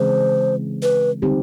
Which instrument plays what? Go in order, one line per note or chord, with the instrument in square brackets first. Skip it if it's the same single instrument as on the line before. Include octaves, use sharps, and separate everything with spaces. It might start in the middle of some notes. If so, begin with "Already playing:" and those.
Already playing: [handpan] C#3 E3 G#3 C4 [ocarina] C5
[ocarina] B4
[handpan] D3 G3 C4 D#4 G4